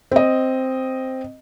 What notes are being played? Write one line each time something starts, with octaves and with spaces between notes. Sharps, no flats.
C4 D#5